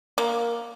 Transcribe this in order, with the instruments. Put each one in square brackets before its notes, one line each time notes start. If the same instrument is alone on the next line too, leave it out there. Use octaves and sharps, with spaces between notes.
[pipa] A#3